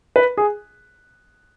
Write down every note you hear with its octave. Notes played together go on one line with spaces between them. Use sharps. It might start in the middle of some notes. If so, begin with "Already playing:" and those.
B4
G#4